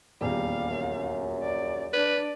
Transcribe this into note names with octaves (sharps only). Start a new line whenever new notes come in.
D#1 A#1 E2 G3 F5
F#2
D5
D4 B4 D5